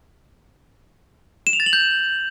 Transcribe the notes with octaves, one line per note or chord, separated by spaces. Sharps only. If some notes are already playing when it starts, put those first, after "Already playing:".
E7
F7
A6
F#7
G6